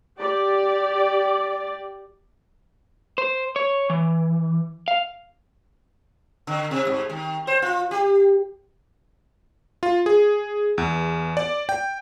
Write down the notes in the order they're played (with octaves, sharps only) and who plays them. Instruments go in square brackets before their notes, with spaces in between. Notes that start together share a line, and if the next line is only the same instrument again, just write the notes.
[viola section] G4 D5
[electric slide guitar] C5
C#5
E3
F5
[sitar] D3
C3
G#2
D#3
C5
F4
G4
[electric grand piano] F4
G#4
E2
D5
G5